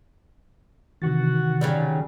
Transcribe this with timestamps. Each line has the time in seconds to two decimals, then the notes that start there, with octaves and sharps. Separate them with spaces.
1.02 C3 D#3 E3 F#4 A6
1.61 C#3 F#3 G3